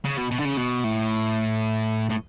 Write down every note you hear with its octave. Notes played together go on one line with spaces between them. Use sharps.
C#3
B2
B2
D3
C#3
B2
A2
A2